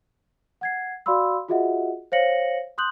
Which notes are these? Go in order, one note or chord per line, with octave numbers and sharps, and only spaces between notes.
F#5 G#6 C7
F#4 D5 F5 B5 C6 E6
F4 F#4 G#4 D#5 E5 F#5
C5 C#5 F5 A#6 C#7 F#7
C6 D#6 F#6 G6 F#7